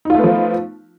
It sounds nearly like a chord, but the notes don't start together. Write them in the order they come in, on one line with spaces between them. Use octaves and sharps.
D#4 F4 A3 B3 F3